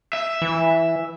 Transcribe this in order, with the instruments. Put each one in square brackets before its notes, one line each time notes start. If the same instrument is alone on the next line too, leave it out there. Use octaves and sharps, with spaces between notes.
[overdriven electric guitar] E5
[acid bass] E3